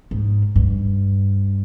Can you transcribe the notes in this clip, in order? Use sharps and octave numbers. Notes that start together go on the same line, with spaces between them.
G#2
G2